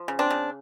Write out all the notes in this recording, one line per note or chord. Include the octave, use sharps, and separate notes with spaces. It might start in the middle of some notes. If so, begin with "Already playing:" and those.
Already playing: F3
C#3
C4 D4
C#3